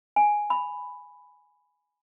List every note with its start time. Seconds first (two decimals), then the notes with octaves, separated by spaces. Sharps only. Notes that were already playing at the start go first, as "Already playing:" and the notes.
0.16 G#5
0.50 B5